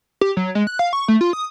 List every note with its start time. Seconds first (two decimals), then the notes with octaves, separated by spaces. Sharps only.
0.21 G4
0.37 F#3
0.55 G#3
0.67 F#6
0.79 F5
0.93 C#6
1.08 A3
1.21 F4
1.33 D#6